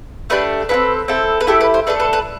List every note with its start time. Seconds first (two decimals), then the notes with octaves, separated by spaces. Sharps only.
0.30 A3 D4 G4 B4
0.69 C4 E4 A4 B4
1.08 C4 E4 A4
1.41 B4
1.47 A3 E4 G4 A4
1.61 B4
1.74 C5
1.87 A3 D4 A4 B4
2.00 B4
2.13 B4